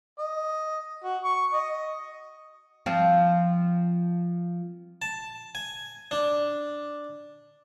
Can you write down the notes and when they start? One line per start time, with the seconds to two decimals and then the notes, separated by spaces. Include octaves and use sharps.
0.19 D#5
1.04 F#4
1.24 C#6
1.53 D#5
2.86 F3 C4
5.02 A5
5.55 G#5
6.11 D4